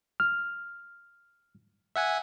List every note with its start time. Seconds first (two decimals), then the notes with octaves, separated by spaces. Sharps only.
0.20 F6
1.96 E5 F#5 G#5